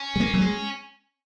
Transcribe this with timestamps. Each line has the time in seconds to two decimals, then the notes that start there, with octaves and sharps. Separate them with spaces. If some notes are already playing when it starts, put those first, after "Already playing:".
Already playing: C#4
0.16 G#3
0.20 A#3
0.34 F#3
0.41 G#3